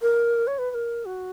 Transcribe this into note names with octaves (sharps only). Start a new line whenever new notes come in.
A#4
C#5
B4
B4
A#4
F#4